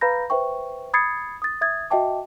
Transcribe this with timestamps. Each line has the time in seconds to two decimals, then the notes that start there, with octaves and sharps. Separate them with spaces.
0.01 B4 F5 A#5 B5 G6 A#6
0.30 B4 C5 E5 G5 C#6
0.94 B5 D#6 G#6 A6 C7 C#7
1.42 D#6 A6
1.61 E5 D#6 G#6 A6
1.90 F#4 D#5 E5 G5 A5 D6